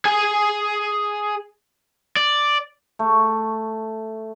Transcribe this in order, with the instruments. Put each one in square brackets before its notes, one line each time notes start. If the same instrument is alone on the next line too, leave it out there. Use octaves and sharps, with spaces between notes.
[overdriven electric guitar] G#4 G#5
D5
[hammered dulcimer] A3